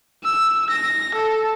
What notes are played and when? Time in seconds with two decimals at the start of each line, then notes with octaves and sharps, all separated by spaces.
0.24 E6
0.70 A#6
1.15 A4